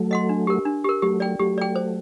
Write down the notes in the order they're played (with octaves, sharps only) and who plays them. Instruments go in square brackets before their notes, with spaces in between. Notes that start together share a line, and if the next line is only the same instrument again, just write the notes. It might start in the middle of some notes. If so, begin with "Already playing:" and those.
Already playing: [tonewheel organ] F#3 A3
[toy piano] D#5 F#5 C6
D4
G4 A#4
D4
G4 A#4
[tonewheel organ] F#3 A3 [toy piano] G4
[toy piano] D5 G5
[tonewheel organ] F#3 A3 [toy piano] G4
[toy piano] D5 G5
C5